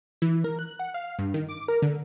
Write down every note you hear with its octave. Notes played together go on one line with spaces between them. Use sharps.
E3
A#4
F#6
F#5
F5
G2
D#3
D6
A#4
D3